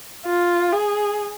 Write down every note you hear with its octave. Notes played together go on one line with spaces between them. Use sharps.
F4
G#4